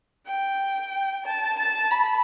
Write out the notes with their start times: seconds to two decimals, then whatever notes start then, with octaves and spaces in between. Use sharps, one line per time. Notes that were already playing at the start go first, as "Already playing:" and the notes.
0.27 G5
1.26 A5
1.59 A5
1.91 B5